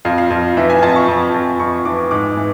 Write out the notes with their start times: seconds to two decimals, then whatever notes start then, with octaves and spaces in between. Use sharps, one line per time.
0.05 F2 F5
0.18 F5
0.30 F2
0.57 E3 E5
0.70 G#5
0.83 F2 A5
0.95 C#6
1.08 F2
1.34 F2
1.59 F2 C#6
1.85 E3 D6
2.11 G#2 D6
2.37 E3